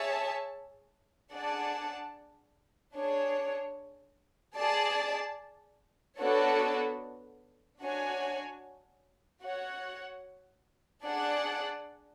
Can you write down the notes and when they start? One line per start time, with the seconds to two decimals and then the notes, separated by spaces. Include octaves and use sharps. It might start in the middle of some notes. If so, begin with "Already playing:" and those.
Already playing: G#4 C#5 E5 A5
1.32 D4 G#4 D5 F#5 A5
2.94 D4 G#4 C#5
4.56 G#4 D5 A5
6.19 B3 D4 F#4 A4 C#5
7.81 D4 F#4 C#5 G#5
9.42 F#4 C#5 F#5
11.05 D4 G#4 D5 F#5